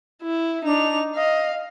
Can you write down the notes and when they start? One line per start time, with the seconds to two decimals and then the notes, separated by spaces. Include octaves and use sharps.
0.23 E4
0.65 D4 D#4 F7
1.15 D#5 F5